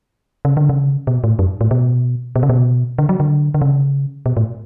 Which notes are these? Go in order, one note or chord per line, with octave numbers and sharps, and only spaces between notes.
C#3
D3
C#3
B2
A2
F#2
A2
B2
B2
C#3
B2
D3
F#3
D3
D3
C#3
B2
A2